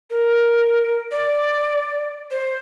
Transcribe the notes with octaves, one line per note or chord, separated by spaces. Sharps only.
A#4
D5
C5